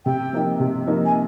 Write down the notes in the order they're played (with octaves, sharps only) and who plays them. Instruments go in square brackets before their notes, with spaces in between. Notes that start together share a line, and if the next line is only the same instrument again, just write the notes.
[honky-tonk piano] C3 [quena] G5
[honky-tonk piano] F3 A#3 D#4
C3
F3 A#3 D#4
[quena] G#5